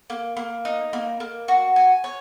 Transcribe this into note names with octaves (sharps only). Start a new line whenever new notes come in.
A#3
A#3
D#4
A#3
A#3
F#4
G#5
C#5